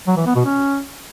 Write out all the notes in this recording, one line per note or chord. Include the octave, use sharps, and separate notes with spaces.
F#3
E3
B3
B2
C#4